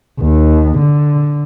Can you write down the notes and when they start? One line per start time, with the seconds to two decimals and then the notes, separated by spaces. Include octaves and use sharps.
0.20 D#2
0.79 D3